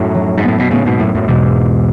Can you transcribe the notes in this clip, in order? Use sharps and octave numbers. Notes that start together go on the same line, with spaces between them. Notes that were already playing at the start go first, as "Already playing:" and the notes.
Already playing: F#2 A2 D#4 F#4
F#3
G#2
B3
A2
B2
A2 C#3 B3
G#2 B2
F#2 A2 E4
F#2 A2
E2 G#2 B2